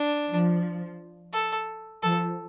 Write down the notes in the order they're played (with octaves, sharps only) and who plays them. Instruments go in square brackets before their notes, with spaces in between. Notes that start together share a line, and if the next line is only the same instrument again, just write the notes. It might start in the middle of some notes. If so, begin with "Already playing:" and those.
Already playing: [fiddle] D4
[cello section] F3
[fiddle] A4
[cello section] F3 [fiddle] A4